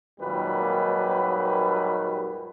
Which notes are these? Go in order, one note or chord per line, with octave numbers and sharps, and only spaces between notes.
G#1 D#2 A#2 F#3 G3 B4